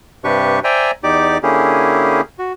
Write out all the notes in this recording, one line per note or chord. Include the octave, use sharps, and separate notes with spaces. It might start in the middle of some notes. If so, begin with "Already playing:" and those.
G2 C3 D4 G4 B4 C#6
C5 D5 E5 G5 G#5 A#5
E2 D#4 G4 D5 D6
D3 A#3 C#4 E4 G4 G#4
F#4